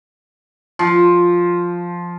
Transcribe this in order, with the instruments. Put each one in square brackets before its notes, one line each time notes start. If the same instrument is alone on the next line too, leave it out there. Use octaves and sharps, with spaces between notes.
[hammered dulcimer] F3